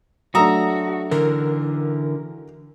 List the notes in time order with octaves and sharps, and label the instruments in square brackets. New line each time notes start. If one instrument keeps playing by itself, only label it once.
[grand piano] F#3 A3 D4 [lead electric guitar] F#4 [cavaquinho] E5 A#5 D#6
[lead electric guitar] D3 E3 [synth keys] A#4